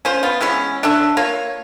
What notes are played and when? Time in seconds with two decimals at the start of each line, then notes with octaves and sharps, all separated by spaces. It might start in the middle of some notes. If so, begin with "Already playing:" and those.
0.05 C#4 F4 C5
0.23 B3 F4
0.41 E3 G#3 B3 C#4
0.83 D4 A4 C#5 E5
1.17 A#3 F4 C#5